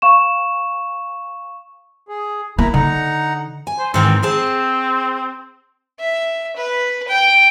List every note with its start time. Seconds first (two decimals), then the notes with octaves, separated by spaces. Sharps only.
0.02 F5 C#6 E7
2.08 G#4
2.58 A#3 E4 A#5 B5
2.74 D3 D#4 F#5 A#5
3.67 G#5
3.79 C5
3.94 G#2 D#3 E3 C4
4.23 C4 G#4 C5 A5
5.99 E5
6.57 B4
7.08 G5